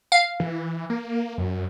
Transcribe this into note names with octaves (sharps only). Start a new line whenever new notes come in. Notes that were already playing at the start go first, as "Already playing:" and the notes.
F5
E3
A#3
F#2